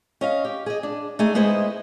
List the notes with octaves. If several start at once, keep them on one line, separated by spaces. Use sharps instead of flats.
C#4 D#5 F5
G4
G#4 D#5
D4
A3 D#4 G#4
G#3 B3 E4 C5 D#5